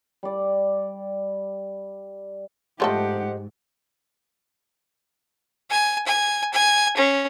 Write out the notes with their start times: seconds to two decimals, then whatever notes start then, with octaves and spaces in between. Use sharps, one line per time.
0.23 G3 D5
2.80 G#2 F3 A3 G4 A4 C5 D#5 F#5
5.70 G#5
6.06 G#5
6.53 G#5
6.97 C#4